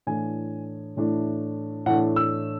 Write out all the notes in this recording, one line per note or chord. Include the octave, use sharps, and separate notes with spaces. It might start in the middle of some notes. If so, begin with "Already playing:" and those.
A2 E3 A3 D4 G#5
A2 E3 A3 D4
A2 E3 A3 D4 F#5
E6